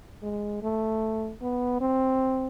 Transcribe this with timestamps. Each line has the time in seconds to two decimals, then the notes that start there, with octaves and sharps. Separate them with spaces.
0.22 G#3
0.62 A3
1.41 B3
1.81 C4